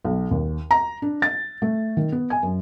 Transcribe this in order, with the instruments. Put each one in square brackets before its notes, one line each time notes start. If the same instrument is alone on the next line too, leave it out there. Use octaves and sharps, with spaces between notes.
[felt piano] B1
D#2
A#5
D4
A6
A3
D#3
B3
G#5
F#2